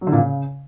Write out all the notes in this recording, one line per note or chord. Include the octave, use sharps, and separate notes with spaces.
F#3
D3
A#2
C#3